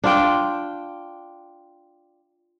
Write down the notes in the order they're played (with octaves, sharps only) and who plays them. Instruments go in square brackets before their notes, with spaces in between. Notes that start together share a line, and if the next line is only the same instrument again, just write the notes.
[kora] D4 F4 G5